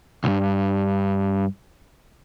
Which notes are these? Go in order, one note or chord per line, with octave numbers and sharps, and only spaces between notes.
B1 G2